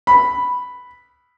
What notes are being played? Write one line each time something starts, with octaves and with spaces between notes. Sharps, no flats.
B5